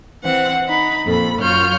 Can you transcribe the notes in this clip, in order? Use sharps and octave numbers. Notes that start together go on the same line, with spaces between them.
E3 C4 F#5
D#4 B5
F2 A#2 A4 B5
F#2 F4 C#5 F6 G6